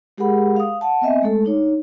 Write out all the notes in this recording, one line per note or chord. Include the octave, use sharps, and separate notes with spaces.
G#3 G4 G#4 A#4 F#5 B5
F5 D#6
F#5 A5
B3 C4 D#5 E5 G#5
G#3 A3 A4
D4 D#4 C#5